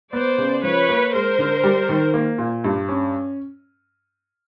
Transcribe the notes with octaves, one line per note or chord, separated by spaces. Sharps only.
B3 C5 D5
C#3
F3 B4 C#5
A#3
G#3 A#4 C5
D3
G3
D#3
A#3
A#2
G2
C#4